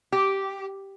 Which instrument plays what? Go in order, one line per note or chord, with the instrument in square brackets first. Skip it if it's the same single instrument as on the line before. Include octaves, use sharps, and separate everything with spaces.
[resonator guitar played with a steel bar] G4